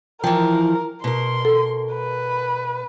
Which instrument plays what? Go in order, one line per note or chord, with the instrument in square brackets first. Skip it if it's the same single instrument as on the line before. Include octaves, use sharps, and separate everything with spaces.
[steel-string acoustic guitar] E3 F3 [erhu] A#4 [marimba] G5
[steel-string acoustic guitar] B2 A#4 [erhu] C6
[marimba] A4
[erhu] B4